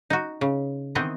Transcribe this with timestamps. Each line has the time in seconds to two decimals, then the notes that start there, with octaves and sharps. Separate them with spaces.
0.10 D#4 F#4
0.41 C#3
0.95 D#3 E3 B3 C4 D#4 D#5